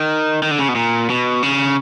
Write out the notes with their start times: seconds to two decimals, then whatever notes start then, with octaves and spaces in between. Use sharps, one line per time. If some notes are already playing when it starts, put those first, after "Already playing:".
Already playing: D#3
0.43 D#3
0.51 D3
0.59 C#3
0.68 B2
0.76 A#2
1.10 B2
1.43 C#3